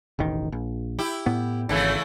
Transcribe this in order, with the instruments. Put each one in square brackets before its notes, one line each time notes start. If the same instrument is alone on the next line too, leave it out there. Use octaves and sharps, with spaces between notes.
[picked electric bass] E1 A1 D#3
A#1
[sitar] E4 G4
[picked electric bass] A2 B3
[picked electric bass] G#1 [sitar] C#3 E3 A3